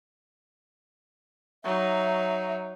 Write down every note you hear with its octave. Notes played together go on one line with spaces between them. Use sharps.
F#3 D#4 E5